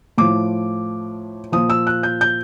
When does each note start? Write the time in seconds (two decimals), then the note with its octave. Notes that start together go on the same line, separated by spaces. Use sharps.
0.18 A2 F3 D6
1.52 A#2 F3 D#6
1.70 E6
1.87 F#6
2.03 G6
2.21 G6